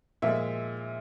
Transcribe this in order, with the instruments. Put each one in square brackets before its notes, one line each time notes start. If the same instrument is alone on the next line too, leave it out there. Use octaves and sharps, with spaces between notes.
[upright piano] A#2 F3 G#3 E5